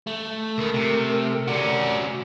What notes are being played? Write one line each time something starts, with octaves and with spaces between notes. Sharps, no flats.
A3
C#2 B3 A#4
C3
C3 C#4 F#4 D5